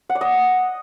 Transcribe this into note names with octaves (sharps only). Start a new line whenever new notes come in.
F#5
D5
D#5